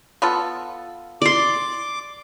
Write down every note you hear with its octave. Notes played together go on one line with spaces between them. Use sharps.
B3 F4 A4
D5 C6 D6